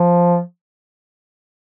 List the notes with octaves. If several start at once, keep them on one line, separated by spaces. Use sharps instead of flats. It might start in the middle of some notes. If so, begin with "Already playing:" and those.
Already playing: F3